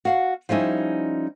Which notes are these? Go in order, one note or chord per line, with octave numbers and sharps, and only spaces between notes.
F#4 F5 F#5
F3 G3 C#4 D#4 E4